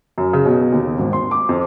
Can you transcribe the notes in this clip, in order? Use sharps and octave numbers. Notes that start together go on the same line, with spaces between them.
F#2
C#3
B2
D#2
G#1
C6
D6
F2